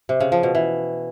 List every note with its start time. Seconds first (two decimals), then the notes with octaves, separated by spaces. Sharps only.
0.09 C3
0.20 C#3
0.32 F3
0.43 B2
0.55 E3